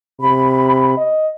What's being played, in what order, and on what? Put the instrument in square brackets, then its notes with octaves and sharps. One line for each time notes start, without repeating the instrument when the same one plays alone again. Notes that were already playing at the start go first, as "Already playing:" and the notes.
[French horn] C3 [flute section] B5
[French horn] D#5